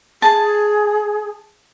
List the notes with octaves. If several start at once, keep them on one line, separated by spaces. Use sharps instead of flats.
G#4 A5